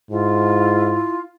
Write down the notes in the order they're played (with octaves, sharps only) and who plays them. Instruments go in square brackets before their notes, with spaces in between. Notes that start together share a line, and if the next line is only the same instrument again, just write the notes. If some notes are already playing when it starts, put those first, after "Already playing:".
[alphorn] G#2 [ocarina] E4 [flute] F4